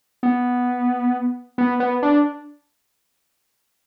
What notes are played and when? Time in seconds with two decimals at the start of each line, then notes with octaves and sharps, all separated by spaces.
0.23 B3
1.58 B3
1.80 B3
2.03 D4